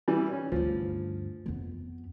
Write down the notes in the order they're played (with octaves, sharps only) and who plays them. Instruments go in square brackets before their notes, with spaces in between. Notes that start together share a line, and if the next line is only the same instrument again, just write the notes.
[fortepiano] E3 G3
C#4
[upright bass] D2 G2 [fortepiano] F3
[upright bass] F2 B3